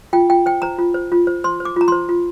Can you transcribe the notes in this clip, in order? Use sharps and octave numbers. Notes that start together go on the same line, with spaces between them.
F4 G5
F4 G5
C5 G5
C5 A#5
F4
C5
F4
C5
C5 C6
C5
D6
F4 A#5
C5 C6
F4